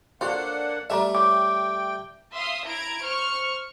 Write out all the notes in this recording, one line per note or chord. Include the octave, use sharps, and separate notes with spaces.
A#3 D4 F4 A4 C5 C#5 F#5
G3 A3 A#4 D5 E5
E3 C#4 G5 D6
E5 F5 C6 D#6
E4 A#5 G#6 D7
C5 C#6 F6